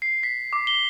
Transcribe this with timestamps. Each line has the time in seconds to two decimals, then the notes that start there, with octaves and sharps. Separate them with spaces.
0.02 C7
0.23 B6
0.53 D6
0.67 G7